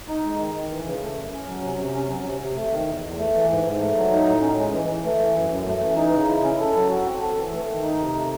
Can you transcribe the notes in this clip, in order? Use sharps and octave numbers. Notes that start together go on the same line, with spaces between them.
D#4
G#3
D#3
D#3
E3
C#3
A3
F#2
C#4
F#3
C3
C3
C#4
F#3
C3
C3
A3
D#3
E2
E2
A3
E3
G#2
G#2
A3
F#3
D#4
A2
C#4
G#3
E3
E3
A3
E3
F#2
F#2
A3
E3
D#4
C#3
E4
C#4
A4
F#3
F#4
C4
A4
E3
A3
D#3
D#4
C3
A3